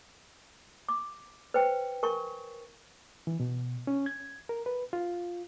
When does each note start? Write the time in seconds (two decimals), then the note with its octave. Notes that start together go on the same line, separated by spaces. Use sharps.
0.89 D6
1.54 B4 C5 G5
2.03 A#4 G#5 C#6
3.27 E3
3.40 B2
3.87 C#4
4.06 G#6
4.49 A#4
4.66 B4
4.93 F4